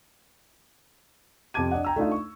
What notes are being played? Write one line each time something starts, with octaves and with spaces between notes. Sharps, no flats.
F2 C3 A5 D6 G#6 D#7
D4 D#5 F#5
G5 A#5 E6
A3 D4 D#4 F4
C#6